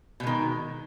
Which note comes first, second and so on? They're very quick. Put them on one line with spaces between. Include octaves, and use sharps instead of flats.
B2 G#3 D#3